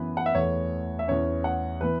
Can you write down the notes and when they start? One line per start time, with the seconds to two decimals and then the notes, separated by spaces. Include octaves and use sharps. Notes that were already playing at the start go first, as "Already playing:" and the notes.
Already playing: F#2 E3 B3 B4
0.17 F#5
0.26 E5
0.35 E2 E3 A3 C#5
0.99 E5
1.08 E2 E3 C#4 C#5
1.44 F#5
1.81 E3 B3 B4